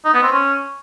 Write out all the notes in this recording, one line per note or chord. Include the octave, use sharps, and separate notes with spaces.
D#4
B3
C4
C#4